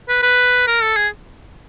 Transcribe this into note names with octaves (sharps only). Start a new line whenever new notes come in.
B4
B4
A#4
A4
G#4